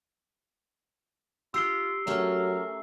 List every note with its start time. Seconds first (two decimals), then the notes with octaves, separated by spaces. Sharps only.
1.54 F4 G4 E6 C7 G7
2.07 F#3 A3 C#4 A#4